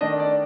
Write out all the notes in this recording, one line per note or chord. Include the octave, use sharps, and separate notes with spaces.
D#3 A3 D4 D#5
D5